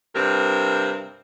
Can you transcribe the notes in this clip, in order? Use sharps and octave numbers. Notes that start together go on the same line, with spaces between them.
G2 C3 C4 A#4